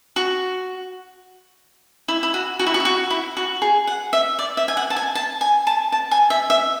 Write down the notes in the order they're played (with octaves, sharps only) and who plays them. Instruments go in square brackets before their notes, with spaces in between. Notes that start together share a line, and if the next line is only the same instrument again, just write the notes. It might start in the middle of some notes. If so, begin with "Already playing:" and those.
[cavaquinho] F#4
E4
E4
F#4
F#4
E4
F#4
E4
F#4
E4
F#4
G#4
F#5
E5
D5
E5
G#5
F#5
A5
G#5
A5
G#5
A5
A5
G#5
E5
E5